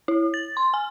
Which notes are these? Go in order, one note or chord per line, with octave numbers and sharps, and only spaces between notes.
E4
A6
C6
G#5